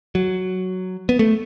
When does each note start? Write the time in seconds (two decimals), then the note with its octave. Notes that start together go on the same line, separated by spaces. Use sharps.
0.15 F#3
1.09 B3
1.19 A3